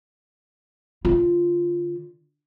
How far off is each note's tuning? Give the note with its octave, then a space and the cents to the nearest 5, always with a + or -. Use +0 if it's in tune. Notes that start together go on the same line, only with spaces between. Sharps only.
D3 +10 F4 -5